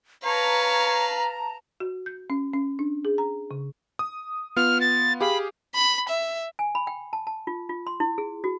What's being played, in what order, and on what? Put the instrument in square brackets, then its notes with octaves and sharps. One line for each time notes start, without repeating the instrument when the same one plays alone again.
[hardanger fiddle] B4 F5 [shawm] C#5 [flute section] A5 A#5
[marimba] F#4
G6
C#4
C#4
D4
G#4
A#5
C#3
[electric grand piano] D#6
[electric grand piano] B3 F4 [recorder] F6
[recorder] A6
[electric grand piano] G4 G#4 F5 [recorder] B5
[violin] B5
E5
[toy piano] G#5
B5
G5
A5
A5
F4
F4
C6
E4
G#4
F#4